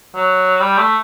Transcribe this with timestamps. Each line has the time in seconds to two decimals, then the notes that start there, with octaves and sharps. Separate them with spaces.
0.15 F#3
0.60 G3
0.78 A3